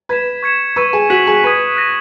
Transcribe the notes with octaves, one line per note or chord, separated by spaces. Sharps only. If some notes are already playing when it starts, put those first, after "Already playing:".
B4 G#6 B6 E7
C#6 G#6 C#7 E7
B4 C#6 E6 G#6 D#7
G#4
F#4 F#6 B6 D#7 F#7
G#4
B4 D#6 G#6 B6 D#7
F#6 A#6 D#7